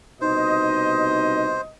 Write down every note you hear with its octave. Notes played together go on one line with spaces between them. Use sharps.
C2 B2 D#4 C5 D#5